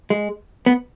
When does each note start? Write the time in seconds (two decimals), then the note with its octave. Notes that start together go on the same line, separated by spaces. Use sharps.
0.10 G#3
0.66 B3